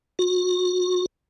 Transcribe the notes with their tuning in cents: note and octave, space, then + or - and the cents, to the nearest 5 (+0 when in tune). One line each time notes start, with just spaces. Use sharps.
F#4 -35